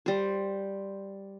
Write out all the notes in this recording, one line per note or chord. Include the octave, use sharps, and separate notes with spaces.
G3 C5